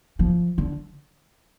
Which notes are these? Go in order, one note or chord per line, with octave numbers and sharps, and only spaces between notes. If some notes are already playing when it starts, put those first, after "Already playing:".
F3
D3